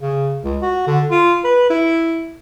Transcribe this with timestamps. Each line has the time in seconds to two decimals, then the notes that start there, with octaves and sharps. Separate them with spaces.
0.01 C#3
0.44 C#2
0.62 F#4
0.87 D3
1.10 F4
1.44 B4
1.70 E4